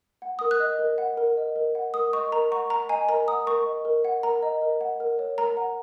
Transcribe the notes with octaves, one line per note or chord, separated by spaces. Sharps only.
F#5
A#4 D#6
F#6
D#5
A#4
F#5
A#4
D#5
A#4
F#5
A#4 D#6
D#5 C#6
A#4 A#5
F#5 C#6
A#4 A#5
D#5 G#5
A#4 A#5
F#5 D#6
A#4 C#6
D#5
A#4
F#5
A#4 A#5
D#5
A#4
F#5
A#4
C#5
A#4 A#5
F#5